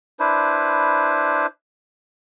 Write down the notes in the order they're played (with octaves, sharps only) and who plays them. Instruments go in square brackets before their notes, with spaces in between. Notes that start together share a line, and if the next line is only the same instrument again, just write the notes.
[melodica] D4 E4 B4 C5